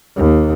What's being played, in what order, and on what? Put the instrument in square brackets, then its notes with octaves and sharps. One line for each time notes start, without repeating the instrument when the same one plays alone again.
[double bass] D#2